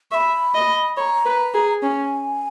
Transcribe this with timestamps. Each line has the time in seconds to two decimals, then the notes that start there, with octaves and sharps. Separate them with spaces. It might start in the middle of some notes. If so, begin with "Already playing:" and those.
0.11 E5 B5 C#6
0.55 D#5
0.97 C#5 A#5 B5
1.25 B4
1.54 G#4
1.82 C#4 G#5